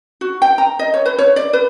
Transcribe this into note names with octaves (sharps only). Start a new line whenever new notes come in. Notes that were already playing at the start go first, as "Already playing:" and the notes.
F#4
G5
A#5
D#5
C#5
B4
C#5
D5
B4